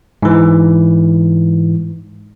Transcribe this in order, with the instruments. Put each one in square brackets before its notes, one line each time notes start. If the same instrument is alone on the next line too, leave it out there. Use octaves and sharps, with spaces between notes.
[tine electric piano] G#2 E3